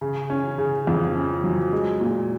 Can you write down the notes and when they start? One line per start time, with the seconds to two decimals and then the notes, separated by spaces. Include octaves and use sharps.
0.01 C#3
0.30 C#4
0.58 C#3
0.87 F2
1.16 C#4
1.44 F#3
1.73 G#3
2.01 A#2